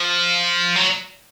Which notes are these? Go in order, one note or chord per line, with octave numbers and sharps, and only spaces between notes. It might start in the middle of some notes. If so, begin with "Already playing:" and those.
Already playing: F3
F#3